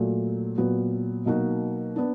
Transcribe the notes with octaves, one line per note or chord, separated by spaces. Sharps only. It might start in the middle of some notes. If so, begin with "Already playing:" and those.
Already playing: A#2 F#3 A3
A#2 F#3 B3
B2 F#3 A#3 D#4 F#4
B3 D4